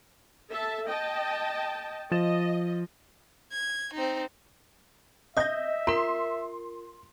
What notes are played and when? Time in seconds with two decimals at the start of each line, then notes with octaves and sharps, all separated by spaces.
0.51 A4 E5 A5
0.88 D#5 G5 A5
2.11 F3 D#5 A6 E7
3.52 G#6
3.93 C4 D#4
5.37 D#5 E5 D#6 G6 A#6
5.87 F4 A#4 C6